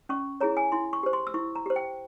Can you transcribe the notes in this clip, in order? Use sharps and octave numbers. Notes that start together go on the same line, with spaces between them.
C#4 C#6
E4 G#4 C#5 A#5
G#5
E4 C6
C#6
G4 C5
C6
E6
E4 C#6
A#5
G4 C5
G5